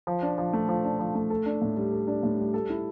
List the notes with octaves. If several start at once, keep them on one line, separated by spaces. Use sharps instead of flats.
F3
D4
F3
A3
F3
D4
F3
A3
A4
D4
A2
G3
A4
D4
A2
G3
A4
E4